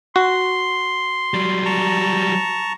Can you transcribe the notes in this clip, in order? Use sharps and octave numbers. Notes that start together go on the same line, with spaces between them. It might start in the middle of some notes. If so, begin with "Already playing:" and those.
F#4 C6
F#3 G3
A5 A#5 C#6